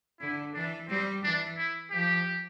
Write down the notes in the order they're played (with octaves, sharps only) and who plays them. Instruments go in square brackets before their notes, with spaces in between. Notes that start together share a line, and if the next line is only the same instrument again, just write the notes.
[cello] D3 [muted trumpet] E4
[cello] E3 [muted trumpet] D4
[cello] G3 [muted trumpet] C4
[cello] E3 [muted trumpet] D4
[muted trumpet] E4
[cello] F3 [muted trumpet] G4